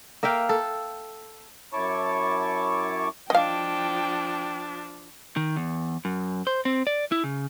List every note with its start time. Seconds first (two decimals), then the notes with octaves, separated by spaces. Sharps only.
0.23 A#3 E5 F5 G5
0.49 A4
1.73 F#2 E4 C#5 A5 C#6 D6
3.30 F3 D4 D#5 F5 G5
5.36 D#3
5.56 E2
6.05 F#2
6.47 C5
6.65 C4
6.87 D5
7.12 E4
7.24 C#3